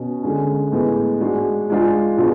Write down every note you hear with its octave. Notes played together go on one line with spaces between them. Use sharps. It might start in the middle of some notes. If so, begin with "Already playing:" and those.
Already playing: B2 C#4
D3 G#3 C#4
A2 G#3 B3
G#2 G#3 D4 F#4
G#2 G#3 D4 F4
B2 G#3 D4 F4